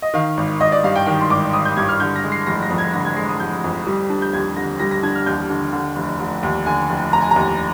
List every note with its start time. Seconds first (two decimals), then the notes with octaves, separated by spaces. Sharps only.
0.02 D#5
0.14 D#3 F5
0.37 G#1
0.60 G#1 D#5
0.72 D5
0.84 G2 F5
0.96 G5
1.07 D#3 G5
1.21 C6
1.30 G#1 D6
1.53 G#1 D#6
1.65 G6
1.77 G2 G#6
1.89 F6
2.00 D3 G6
2.16 A#6
2.24 G#3
2.32 C7
2.47 F1 A#6
2.63 A#6
2.70 F2
2.78 G#6
2.93 D3 A#6
3.05 G#6
3.17 G#3 C7
3.28 D#6
3.40 F1 G6
3.64 F2
3.87 G3
4.10 D4
4.22 G6
4.33 D#2 G#6
4.56 D3 A#6
4.80 G3 A#6
4.91 A#6
5.03 D4 G#6
5.15 F6
5.26 D#2 G6
5.50 D3
5.73 D3
5.96 F1
6.19 F1
6.43 D#2
6.66 D3 G#5
6.90 F1
7.13 F1 A#5
7.22 G#5
7.31 D#2 A#5